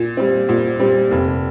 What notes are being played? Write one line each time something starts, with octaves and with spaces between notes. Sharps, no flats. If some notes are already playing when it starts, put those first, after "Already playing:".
Already playing: A#2
G3 C4
A#2
G3 C4
F1